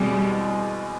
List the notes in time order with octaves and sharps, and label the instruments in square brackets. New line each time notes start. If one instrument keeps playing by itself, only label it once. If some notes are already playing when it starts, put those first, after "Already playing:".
Already playing: [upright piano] E2 B2 G#3 C4 [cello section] G3